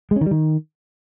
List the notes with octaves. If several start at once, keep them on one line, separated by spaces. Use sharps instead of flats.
G#3
C#4
D#3
G3
D#3